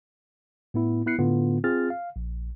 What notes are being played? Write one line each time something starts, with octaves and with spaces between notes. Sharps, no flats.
A2 B3 E4
B3 E4 F#6 C7 C#7
A2 D3 B3 F4
C4 F4 G#4 F6 A6
F5
A#1